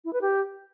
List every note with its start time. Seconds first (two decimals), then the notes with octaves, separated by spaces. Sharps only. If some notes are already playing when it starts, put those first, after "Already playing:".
0.05 E4
0.13 B4
0.22 G4